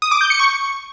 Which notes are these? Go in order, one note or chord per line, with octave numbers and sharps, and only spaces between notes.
D#6
D6
G6
C#7
C#6